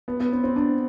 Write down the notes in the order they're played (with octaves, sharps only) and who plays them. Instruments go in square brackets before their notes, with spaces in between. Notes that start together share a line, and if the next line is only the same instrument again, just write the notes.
[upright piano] B3
B3
C4
C4
D4